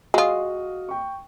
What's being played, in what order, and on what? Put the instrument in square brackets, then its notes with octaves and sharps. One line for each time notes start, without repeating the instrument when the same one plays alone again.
[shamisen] G#3 F4 [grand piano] F#4 F5 D#6
[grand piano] G5 C#6